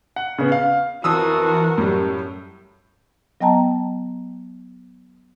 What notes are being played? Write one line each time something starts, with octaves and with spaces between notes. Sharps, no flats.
F#5
C#3 B3
F5
F2 E3 F#4 A#4 D#6 E6
F#2 A2 G3
F#3 B3 D#5 G5 A5 A#5